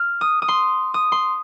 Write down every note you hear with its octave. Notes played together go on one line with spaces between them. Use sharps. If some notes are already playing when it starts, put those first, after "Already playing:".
Already playing: F6
D#6
D#6
C6
D#6
C6